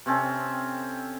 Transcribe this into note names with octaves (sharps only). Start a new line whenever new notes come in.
C3 C4 C#4 A4